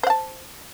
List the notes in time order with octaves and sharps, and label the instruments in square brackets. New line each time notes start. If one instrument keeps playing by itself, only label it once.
[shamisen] C5
F#5
A5